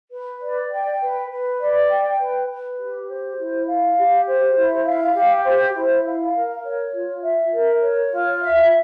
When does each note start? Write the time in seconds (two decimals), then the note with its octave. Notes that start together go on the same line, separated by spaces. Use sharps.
0.11 B4
0.41 D5
0.71 G5
1.00 B4
1.30 B4
1.60 D5
1.90 G5
2.19 B4
2.49 B4
2.78 G4
3.07 C5
3.37 E4
3.67 F5
3.97 G4
4.27 C5
4.55 E4
4.85 F5
5.15 G4
5.45 C5
5.75 E4
6.04 F5
6.34 A#4
6.63 C#5
6.93 F4
7.22 E5
7.52 A#4
7.82 C#5
8.12 F4
8.41 E5